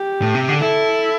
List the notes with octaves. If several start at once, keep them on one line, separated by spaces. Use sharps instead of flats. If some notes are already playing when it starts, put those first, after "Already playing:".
Already playing: G4
A2
C3
D3
E4 A4